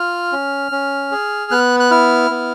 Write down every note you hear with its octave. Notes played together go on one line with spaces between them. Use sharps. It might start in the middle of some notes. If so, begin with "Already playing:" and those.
Already playing: F4 F6
C#4
C#4
G#4
B3 F#6
F#6
E4 F6
B3